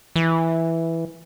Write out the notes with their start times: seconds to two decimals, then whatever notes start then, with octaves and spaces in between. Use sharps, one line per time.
0.16 E3